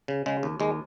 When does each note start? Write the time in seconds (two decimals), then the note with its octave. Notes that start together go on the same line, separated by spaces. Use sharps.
0.08 C#3
0.26 C#3 G#3
0.43 D#2
0.60 D#2 G#3